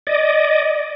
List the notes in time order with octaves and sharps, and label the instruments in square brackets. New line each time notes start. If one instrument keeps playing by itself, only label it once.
[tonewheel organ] D5 D#5